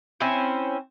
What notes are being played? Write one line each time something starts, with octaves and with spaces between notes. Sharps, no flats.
C4 C#4 E4 C5